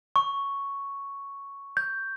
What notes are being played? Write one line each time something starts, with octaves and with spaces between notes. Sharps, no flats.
C#6
G6